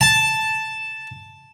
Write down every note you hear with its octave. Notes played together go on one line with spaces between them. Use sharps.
A5